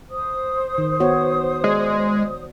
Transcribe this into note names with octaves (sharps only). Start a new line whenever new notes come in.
C5 D#6
D#3
B3 F#4 C#5
G#3 D5